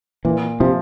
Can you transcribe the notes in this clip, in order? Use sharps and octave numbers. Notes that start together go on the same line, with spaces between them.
A#2 E3
C3 F3